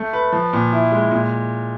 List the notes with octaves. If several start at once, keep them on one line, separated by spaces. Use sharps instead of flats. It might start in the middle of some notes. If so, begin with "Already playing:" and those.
Already playing: A3
B4
F3
A#2
E4
G#3
A#2